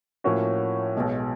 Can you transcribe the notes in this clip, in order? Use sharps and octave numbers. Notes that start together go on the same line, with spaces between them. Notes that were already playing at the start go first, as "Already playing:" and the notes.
A2 F3 A#3 C#4 F#4
B1 B2 G#3